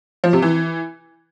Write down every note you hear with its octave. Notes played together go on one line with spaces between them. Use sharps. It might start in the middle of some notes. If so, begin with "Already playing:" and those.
F3
C3
E3